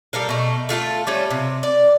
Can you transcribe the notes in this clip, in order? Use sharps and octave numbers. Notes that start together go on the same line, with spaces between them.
G3 A4 A#4 F5
B2 A3
A3 F4 G4 A4
G3 A3 C#4
C3
D5